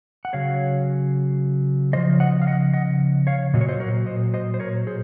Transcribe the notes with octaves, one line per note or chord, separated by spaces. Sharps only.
F#5
C#3 F#3 C#5 F5
C#3 F3 C5 D#5
D#5 F#5
F5
D#5 F#5
D#5 F#5
C#5 F5
A#2 F#3 D#5
C#5
C5 D#5
F#4 A#4
C5 D#5
C5 D#5
C5
A#4 C#5
G#4 C5